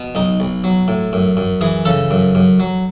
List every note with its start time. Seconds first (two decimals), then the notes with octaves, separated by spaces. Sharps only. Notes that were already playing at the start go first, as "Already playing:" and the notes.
Already playing: B2
0.15 B1 D#4
0.40 B1
0.64 F#3
0.88 A2
1.13 F#2
1.37 F#2
1.61 E3 G#4
1.85 C#3 A4
2.11 F#2
2.35 F#2
2.60 F#3